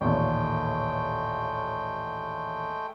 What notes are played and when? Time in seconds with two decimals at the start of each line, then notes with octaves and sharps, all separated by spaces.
0.01 A1 D#2 A#2 G#3 A3 G5